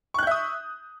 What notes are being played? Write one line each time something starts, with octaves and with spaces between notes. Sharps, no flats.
E5 C#6 D#6 F#6 G6